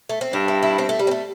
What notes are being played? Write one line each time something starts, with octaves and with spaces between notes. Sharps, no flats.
A3
C4
G2 D4
E4
E4
C4
A3
G3
C4
A3